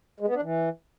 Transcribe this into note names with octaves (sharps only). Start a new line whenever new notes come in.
G#3
B3
D4
E3